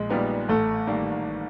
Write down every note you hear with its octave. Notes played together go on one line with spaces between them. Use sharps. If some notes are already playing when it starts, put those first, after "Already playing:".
Already playing: A#1 G#3
A#2 G3 B3 D#4
A1 A3
D#3 G3 A#3